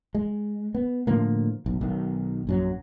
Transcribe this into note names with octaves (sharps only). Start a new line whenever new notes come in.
G#3
B3
A2 D3 F3 A#3
B1
B1 D#3
A#1 F#2 F#3